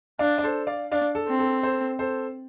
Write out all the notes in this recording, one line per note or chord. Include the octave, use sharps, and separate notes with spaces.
D4 D5 F5
D5
A4 C5
D5 F5
D4 D5 F5
A4
C4
A4
A4 C5
A4 C5